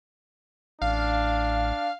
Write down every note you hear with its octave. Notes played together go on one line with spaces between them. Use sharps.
A1 D4 F5